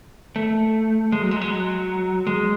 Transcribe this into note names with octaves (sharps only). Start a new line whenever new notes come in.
A3
G#3
F#3
G#3
F#3
G#3
F#3
G#3